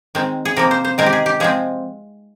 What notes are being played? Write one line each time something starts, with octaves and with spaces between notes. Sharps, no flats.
D#3 G#3 C4
G#4
C3 F3 A#3 A#4
C5
C5
D#3 G#3 C4 A#4
G4
G#4
G4
F3 G#3 C4 G#4